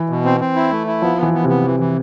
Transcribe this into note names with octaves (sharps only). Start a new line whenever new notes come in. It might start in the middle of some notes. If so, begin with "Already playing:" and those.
Already playing: E3
B2
C4
C4
E4
A3
E4
F3 B3
E3 B3
B3
C3 B3
E3
E3